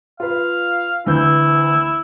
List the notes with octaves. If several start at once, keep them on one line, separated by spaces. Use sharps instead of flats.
F4 B4 F5
D2 E3 E4 G6